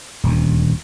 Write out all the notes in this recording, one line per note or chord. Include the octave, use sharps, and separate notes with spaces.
D#1 D2